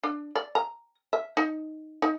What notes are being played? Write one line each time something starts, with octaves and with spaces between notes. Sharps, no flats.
D4
D5
A#5
E5
D#4
D#4